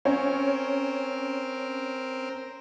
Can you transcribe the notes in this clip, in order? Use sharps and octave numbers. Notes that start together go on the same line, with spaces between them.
C4 C#4 A#4